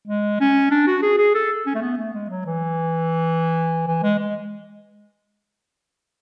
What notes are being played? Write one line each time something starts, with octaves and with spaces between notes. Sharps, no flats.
G#3
C#4
D4
F#4
G#4
G#4
A4
C#4
A3
B3
A3
G#3
F#3
E3
E3
G#3
G#3